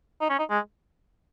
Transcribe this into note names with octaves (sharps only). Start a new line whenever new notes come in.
D#4
C#4
D#4
G#3